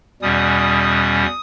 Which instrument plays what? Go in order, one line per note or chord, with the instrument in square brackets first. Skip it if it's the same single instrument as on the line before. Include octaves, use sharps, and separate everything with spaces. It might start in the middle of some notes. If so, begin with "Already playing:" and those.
[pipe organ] E2 B2 G3 C#4 D#6